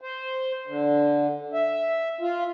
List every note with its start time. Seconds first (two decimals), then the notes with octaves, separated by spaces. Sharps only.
0.01 C5
0.67 D3
1.53 E5
2.21 F4